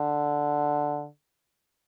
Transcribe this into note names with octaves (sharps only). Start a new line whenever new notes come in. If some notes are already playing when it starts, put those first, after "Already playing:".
Already playing: D3